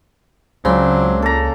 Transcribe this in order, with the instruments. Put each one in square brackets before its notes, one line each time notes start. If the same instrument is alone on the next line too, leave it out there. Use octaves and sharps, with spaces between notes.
[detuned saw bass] C#2 [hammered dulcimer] C#3 [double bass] F#3 D4 [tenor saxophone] C4
[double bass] A#3 [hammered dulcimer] A4 A#5